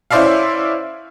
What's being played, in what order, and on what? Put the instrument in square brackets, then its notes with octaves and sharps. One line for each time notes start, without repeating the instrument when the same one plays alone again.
[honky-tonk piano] C#4 E4 C5 D5 E5 F5